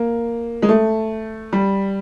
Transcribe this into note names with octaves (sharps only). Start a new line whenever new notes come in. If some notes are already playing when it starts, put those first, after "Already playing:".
Already playing: A#3
G#3
A3
G3